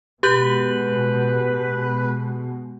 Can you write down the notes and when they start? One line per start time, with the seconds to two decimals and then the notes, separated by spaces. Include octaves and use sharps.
0.23 B2 G#3 G4 B4 G6 F#7